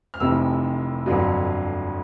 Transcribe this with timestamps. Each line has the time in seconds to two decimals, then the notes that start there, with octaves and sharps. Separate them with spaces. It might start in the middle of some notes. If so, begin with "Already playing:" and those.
0.14 F6
0.20 F1 F2 C3 E3 E6
1.06 G1 F2 D3 F#3